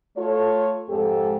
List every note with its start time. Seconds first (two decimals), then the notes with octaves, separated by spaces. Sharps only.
0.17 A3 F4 A4 C#5
0.89 F2 G#2 G#3 G4 A4